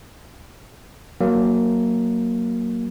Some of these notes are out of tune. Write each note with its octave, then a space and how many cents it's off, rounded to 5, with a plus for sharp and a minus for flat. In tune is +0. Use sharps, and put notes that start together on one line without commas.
F#3 +0 A#3 +0